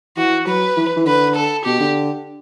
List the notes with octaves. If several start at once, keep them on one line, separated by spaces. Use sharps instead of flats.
E3 F#4
F#3 B4
E3
E3
D3 B4
A4
B2 G4
D3